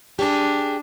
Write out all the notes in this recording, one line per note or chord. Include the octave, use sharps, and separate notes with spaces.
D4 G4 G#4